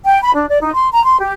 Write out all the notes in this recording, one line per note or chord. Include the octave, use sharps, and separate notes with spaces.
G5
B5
D4
D5
D#4
C6
A#5
C6
G4